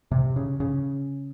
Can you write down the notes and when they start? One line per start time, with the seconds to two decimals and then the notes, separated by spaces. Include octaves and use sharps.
0.11 C3
0.36 C#3
0.60 C#3